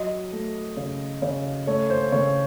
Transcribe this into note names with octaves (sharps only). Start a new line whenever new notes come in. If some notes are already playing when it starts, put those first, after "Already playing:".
Already playing: F#3 D#5
A3
C#3
C#3
A3 C#5
C5
C#3 C#5